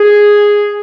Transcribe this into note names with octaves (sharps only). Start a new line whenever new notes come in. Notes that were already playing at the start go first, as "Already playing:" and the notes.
Already playing: G#4